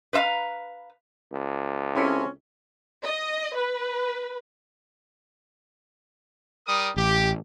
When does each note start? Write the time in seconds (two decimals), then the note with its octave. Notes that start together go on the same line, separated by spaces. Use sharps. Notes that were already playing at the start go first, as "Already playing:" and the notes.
0.13 B4 C5 E5 F5 A#5
1.33 C#2
1.96 C4 C#4 E4 G4 A4
3.03 D#5
3.55 B4
6.67 G3 A#4 D#6
6.96 A1 G4